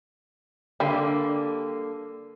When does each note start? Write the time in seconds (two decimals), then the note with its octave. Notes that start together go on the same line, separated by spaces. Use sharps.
0.80 D3 G3 A#3